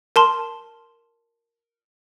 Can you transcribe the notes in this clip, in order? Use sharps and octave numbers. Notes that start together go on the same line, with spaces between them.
A#4 A5 C6